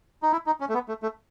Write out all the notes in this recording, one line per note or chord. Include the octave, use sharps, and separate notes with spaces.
D#4
E4
D#4
C#4
A3
B3
A3
A3